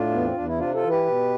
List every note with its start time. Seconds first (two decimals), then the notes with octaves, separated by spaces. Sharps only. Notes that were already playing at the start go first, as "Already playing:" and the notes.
Already playing: A2 D4 F4
0.11 E2 B3
0.24 C4
0.35 E2 D4
0.47 E4
0.58 C3 D4 F4
0.74 F4 A4
0.82 E3
0.90 G4 B4
1.06 B2